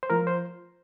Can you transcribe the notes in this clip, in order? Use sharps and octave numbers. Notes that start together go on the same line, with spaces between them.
C5
F3 A#4
C5